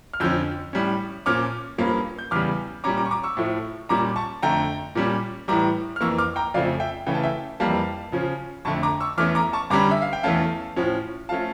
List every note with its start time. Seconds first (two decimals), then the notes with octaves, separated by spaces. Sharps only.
0.13 F6
0.20 F2 D3 F3 C#4 E6 G6
0.73 A2 G3 C#4
1.26 A#2 F3 C#4 D6 F6
1.78 G2 F3 A#3 C#4
2.19 G6
2.31 E2 C#3 G3 D6 F6
2.84 A#2 G3 C#4 A#5 D6
2.97 A#5 D6
3.05 C#6
3.11 A#5 D6
3.23 C#6 E6
3.37 A2 F3 A3
3.89 A#2 G3 C#4 A#5 D6
4.16 A5 C#6
4.43 F2 D3 A3 G5 A#5
4.95 A#2 G3 C#4
5.48 A2 E3 G3 A#5 D6
5.96 F6
6.01 F2 E3 A#3 C#6 E6
6.18 D6 F6
6.36 G5 A#5
6.54 F2 C#3 F3 A3 D5 F5
6.80 E5 G5
7.07 C#3 E3 A3 C#4 G5
7.14 A5
7.23 E5 G5
7.60 F2 E3 G3 A#3 F5 A5
8.12 C#3 F3 C#4
8.65 F2 D3 A3 A5 C#6
8.83 A#5 D6
9.00 C#6 E6
9.18 E2 E3 A3 C#4 D6 F6
9.35 A#5 D6
9.53 A5 C#6
9.70 G2 D3 G3 C#4 A#5 D6
9.91 E5
10.02 F5
10.13 G5
10.23 E2 E3 A3 C#4 F5 A5
10.76 A2 F3 C#4
11.29 F3 A3 C#4 F5 A5